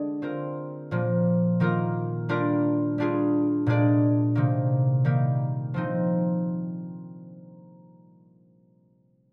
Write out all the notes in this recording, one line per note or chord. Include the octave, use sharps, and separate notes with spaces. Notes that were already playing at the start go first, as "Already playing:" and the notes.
Already playing: D3 G#3 D4 G#4 D5
C4 F4 A#4
A#2 F3 A#3
D#3 A#3 F4 A#4
G3 D4 F4 A#4 D5
G3 D4 F4 G#4
A#2 G#3 D4 G#4 D5
C3 D#3 A#3
D#3 G3 A#3
F3 C4 D#4